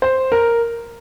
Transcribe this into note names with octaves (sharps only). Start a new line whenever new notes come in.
C5
A#4